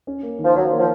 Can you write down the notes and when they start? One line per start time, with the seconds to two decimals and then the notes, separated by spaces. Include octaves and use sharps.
0.07 C#4
0.23 A#3
0.39 D#3
0.45 F3
0.55 D#3 F#3
0.72 A#3
0.79 F3